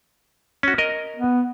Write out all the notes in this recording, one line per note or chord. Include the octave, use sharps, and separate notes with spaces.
C#4 F#4
A#4 D#5
B3